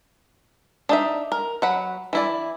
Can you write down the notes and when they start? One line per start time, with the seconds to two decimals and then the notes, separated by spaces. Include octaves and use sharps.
0.89 D4 D#4 E5
1.32 A#4
1.62 F#3 F#5 B5
2.13 E3 E4 D5